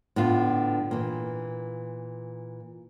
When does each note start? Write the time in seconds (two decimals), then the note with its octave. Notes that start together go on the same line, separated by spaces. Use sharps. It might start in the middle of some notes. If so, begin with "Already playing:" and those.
0.16 A2 D3 B3 F4
0.91 A#2 E3